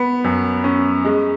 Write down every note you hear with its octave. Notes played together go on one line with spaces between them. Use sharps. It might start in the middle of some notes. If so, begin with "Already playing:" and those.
Already playing: B3
F#2
C#4
G#3